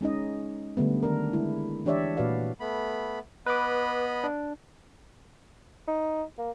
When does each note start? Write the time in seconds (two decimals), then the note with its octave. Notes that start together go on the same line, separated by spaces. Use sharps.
0.01 G#3 C#4 D#4 D#5
0.77 D3 G3 A3 B3
1.03 D#3 D4 A#4
1.33 G#3 E4
1.85 E3 D4 G4 C#5 D5 E5
2.17 A#2 F#4 B4 D5 F5
2.60 A3 B3 B5
3.46 B3 B4 D#5 B5 D6
4.24 D4
5.88 D#4
6.38 A#3